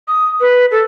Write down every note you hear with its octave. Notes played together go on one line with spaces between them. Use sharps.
D#6
B4
A4